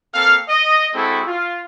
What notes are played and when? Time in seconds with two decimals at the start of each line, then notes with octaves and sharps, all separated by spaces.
0.14 A#3 C4 A4 F5
0.49 D#5
0.95 G#3 C4 E4 F#4 G#4 A4
1.27 F4